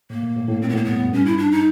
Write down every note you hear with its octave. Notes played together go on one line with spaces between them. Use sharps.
A2 A#3
A#2
A2
A2
A#2 C4
B3
A2 A#3
G2 B3
F#2
G2 C#4
E4
D4
D#4